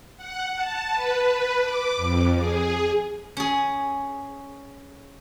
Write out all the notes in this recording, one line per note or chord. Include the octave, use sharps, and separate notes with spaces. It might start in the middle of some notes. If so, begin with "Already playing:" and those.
F#5
A5
B4
B4
D6
F2
G#4
C#4 G#4